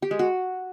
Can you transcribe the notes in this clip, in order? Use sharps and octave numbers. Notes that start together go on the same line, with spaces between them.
G4
G#3
F#4